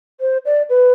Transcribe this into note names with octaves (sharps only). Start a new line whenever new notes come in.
C5
D5
B4